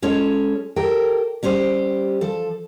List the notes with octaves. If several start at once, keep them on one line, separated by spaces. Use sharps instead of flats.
G#3 C#4 F4 A4 C#5
G4 A4 A#4 G5
G3 C#4 G4 C5
F3 A4